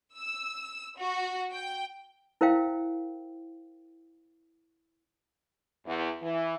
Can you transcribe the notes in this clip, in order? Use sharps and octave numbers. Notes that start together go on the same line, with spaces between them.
E6
F#4
G5
E4 A#4 C5 E5 F5 G5
E2
E3